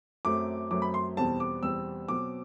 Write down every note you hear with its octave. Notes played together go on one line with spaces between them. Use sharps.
F#2 F#3 A3 C4 D6
F#2 F#3 A3 C4 D6
B5
C6
E2 B2 G3 C4 A5
D6
E2 B2 G3 C4 E6
B2 F#3 C4 D6